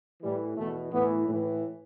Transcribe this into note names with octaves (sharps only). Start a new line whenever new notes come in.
A2 E3 G3
E2 B2 A3
A2 E3 B3
A2 E3